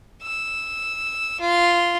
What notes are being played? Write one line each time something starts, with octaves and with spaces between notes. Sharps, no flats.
E6
F4